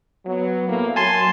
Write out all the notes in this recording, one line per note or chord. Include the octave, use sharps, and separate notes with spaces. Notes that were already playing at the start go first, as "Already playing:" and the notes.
F#3 B3
A2 A#3
F#3 G#5 A5 C6